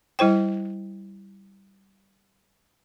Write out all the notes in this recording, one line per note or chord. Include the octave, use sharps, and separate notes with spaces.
G3 E4 C5 G5